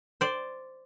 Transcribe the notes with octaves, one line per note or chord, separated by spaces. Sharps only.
C5 D5